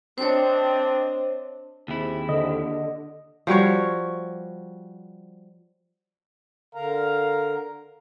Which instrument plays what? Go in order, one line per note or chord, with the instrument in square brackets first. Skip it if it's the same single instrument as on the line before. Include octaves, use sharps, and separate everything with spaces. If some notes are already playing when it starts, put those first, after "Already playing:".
[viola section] C4 D4 D#5 [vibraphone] C5 C#5
[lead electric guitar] D#2 E4 [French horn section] C4 G4 G#4
[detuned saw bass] D3 [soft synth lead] D#5
[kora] F3 G3 F#4 C#5
[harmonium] D3 A#4 A#5 [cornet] F5